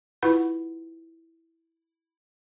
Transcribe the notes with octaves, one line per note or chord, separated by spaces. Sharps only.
E4 F4 B4 F#5 B5